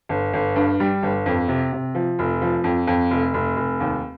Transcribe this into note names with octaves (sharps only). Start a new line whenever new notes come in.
G1
G1
G2
G3
G1
F2
C3
C3
F3
F1
F3
F2
F2
F1
F1
F1
D#2